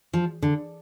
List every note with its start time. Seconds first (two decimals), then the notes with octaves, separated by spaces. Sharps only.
0.13 F3
0.42 D3